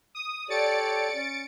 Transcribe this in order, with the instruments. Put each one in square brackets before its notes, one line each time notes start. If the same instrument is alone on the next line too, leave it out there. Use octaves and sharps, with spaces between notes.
[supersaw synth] D#6
[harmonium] G4 A4 C#5 [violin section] D5 [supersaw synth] A6 C#7 D7
[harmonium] C#4